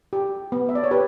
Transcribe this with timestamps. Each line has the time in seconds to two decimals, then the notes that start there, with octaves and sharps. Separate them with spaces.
0.13 G4
0.52 B3
0.69 E5
0.75 D5
0.84 C#5
0.91 G4 B4